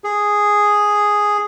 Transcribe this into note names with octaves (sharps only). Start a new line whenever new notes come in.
G#4